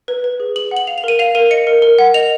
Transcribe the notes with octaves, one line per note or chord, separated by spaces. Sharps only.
B4
B4
G#4
G#4 F#7
F#5
F#7
F5 F7
F7
A#4 D#7
F5 F7
A#4 D#7
D#5 C#7
A#4
A#4
F#5
D#5 F7